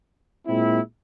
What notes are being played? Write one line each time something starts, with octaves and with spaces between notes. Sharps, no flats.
A#2 G#3 C4 E4